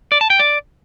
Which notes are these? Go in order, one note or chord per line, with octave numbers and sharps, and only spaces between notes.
D5
A5
G5
D5